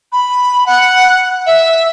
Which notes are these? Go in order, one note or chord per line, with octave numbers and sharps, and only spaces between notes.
B5
F#5
E5